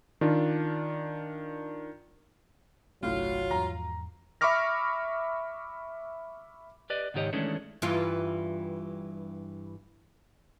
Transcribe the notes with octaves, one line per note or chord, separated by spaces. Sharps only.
D#3 D4 F4
G1 C2 A2 F#3 D4 F4
E2 G#2 F3 A#5
E5 B5 C#6 D6 F6 A#6
G4 B4 D5 D#5
C#2 G#2 D#3 G4 C#5 D#5
D#3 E3 G#3 A3 C#4 D4
G2 E3 F4